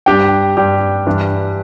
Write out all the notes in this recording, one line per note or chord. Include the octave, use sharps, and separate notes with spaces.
G2 G3 D4 G4 G5
G2 G3 D4 G4
G2 E3 G3 D4